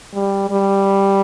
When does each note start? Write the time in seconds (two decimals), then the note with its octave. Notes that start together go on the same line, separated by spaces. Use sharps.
0.15 G3
0.50 G3